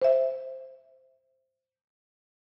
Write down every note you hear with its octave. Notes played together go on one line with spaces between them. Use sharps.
C5 E5